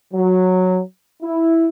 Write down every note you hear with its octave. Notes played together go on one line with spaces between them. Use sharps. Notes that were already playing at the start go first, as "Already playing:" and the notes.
F#3
E4